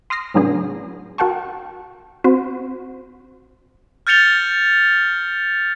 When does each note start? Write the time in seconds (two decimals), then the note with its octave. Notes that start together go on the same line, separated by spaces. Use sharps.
0.10 C6 D#6 F6 A#6 C7
0.34 A2 C#3 F#3 B3 D4 G#4
1.18 F#4 A#4 F#5 G5 A5 C#6
2.24 C4 F#4 C5
4.07 F6 G6 A6 C#7 F7 G7